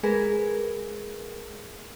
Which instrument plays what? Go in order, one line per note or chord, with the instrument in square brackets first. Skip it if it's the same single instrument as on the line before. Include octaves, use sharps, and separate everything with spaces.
[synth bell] G#3 G#4 A#4 B4